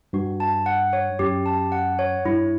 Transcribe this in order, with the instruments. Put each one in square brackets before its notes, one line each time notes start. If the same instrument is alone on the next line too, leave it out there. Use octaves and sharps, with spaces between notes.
[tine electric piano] G2 [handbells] F#4
[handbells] A5
F#5
C#5
[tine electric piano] F#2 [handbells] G4
[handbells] A5
F#5
C#5
[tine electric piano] G2 [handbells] E4